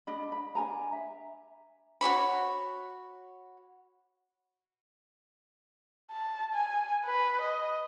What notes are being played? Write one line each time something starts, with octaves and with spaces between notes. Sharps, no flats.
D4 D#5 B5
B5
D4 A#4 G#5 A#5
E5
F#4 G4 C#5 B5
A5
G#5
B4
D#5